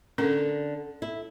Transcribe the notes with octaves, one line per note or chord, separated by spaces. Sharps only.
D3 C#4 A4 A#4
E4